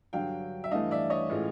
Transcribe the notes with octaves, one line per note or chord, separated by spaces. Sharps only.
G2 D3 F#3 F5 G5
E5
G2 E3 A3 D#5 F5
D5 E5
C#5 D#5
A2 E3 G#3 C#4 F4